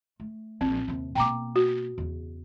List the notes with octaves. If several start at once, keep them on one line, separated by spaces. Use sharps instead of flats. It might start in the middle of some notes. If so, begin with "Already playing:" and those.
A3
D#1 A#1 C4
D#2 C3
B2 A#3 G5 A#5 D6
F#4
E2 C#3